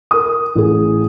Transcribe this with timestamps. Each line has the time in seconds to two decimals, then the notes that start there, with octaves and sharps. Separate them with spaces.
0.11 A#4 D#6
0.55 A1 G#4